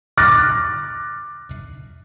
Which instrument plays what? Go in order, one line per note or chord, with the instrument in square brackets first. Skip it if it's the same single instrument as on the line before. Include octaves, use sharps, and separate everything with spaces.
[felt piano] D6 F6 F#6 A6 A#6